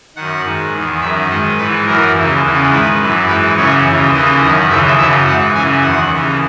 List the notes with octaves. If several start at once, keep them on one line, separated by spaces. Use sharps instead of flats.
F#2 D#3 F#5
G#2 D#3
E2 D#3
F#2 D#3 E5
G#2 D#3 D#5
G#2 E3 B4
F#2 E3 A#4
D#2 C#3 E3
E2 C#3 E3
G#2 D#3 B4
F#2 E3
G#2 E3 B4
F#2 C#3 E3 C#5
D#2 C#3 E3
D#2 C#3 E3 D#5
F#2 D#3 D#5
D#2 C#3 E3 E5
F#2 C#3 E3 E5
G#2 E3 F#5
F#2 C#3 E3 G#5
E2 D#3 F#5
D#2 C#3 E3